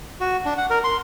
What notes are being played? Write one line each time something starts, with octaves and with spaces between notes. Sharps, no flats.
F#4
D4
F#5
A#4
C6